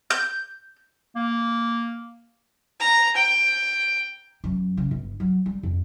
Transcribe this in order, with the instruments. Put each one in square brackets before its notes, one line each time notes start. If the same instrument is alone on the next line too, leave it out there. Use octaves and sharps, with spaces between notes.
[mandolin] G6
[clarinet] A#3
[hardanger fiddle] A#5
G5
[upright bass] F#2
C#3
G1
F#3
G3
F2